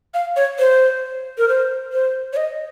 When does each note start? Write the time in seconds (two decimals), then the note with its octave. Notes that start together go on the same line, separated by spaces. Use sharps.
0.14 F5
0.36 C#5
0.59 C5
1.38 A#4
1.48 C5
1.93 C5
2.33 C#5
2.37 D#5